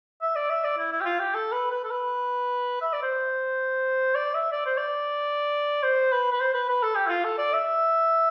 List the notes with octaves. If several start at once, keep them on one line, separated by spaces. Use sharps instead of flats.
E5
D5
E5
D5
E4
E4
G4
F4
G4
A4
B4
B4
A4
B4
E5
D5
C5
D5
E5
D5
C5
D5
C5
B4
B4
C5
B4
B4
A4
G4
E4
F4
A4
D5
E5